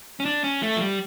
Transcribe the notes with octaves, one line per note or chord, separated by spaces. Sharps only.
C#4
D4
C#4
A3
F3
G3